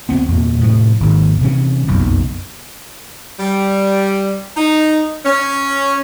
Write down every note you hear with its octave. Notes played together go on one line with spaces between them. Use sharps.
D2 B3 C4
E2 A#2
A2 C3 F3
G#1 D#2
C3 E3 C#4
F#1 B1 F2
G3
D#4
C#4